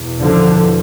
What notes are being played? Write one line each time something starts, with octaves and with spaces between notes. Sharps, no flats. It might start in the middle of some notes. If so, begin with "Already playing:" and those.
Already playing: E2 B2
D3 F3